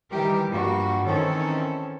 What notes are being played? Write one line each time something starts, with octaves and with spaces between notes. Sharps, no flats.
D#3 E3 G3 G4 A#4
G2 F3 G3 A#3 F#4
D#3 E3 C4 C#4 A4 C#5